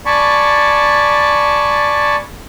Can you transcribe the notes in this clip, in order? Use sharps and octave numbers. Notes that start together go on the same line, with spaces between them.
D5 G#5 A5 B5 C#6